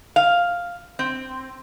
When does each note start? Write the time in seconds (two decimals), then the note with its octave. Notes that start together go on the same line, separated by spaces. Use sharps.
0.16 F5
0.99 C4